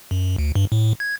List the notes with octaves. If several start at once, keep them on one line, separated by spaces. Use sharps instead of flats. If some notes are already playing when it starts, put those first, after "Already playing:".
F#2
D2
G2
A2
G#6